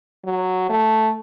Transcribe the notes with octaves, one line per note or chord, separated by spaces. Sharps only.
F#3
A3